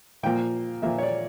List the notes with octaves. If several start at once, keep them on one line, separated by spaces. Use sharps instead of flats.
A#2 F3 A#3 G5
A#2 F3 A#3 E5
C#5
D5